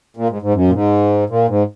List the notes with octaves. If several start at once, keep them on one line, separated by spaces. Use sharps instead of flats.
A#2
G#2
G#2
F#2
A#2
G#2
A#2
G#2